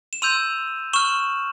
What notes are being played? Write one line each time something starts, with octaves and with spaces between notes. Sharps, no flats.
E7
C6 E6 G6 D#7 F7
C#6 F6 E7 F#7